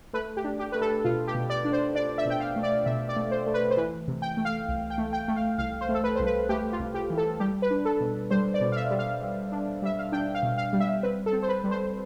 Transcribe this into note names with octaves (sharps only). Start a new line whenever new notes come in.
A3 B4
G4
D4
G4
A3 B4
A4
B2 F4
G4
B2
D5
D4
C5
D4 D5
E5
B2 G5
F5
A3
D5
B2 E5
D5
A3
C5
A3
B4
C5
E3 B4
C3
G5
A3
F5
C2
G5
A3
G5
A3
F5
C2 F5
C5
A3
A4
B4
C2 C5
B4
A3 G4
F4
C2
G4
E3
A4
G3 G4
B4
D4
A4
B2
G3 C5
D5
B2
F5
E5
G3
F5
G3
D4
G3 E5
F5
D4 G5
F5
B2
F5
G3
E5
C4 B4
A4
C4
C5
B4
G3
C5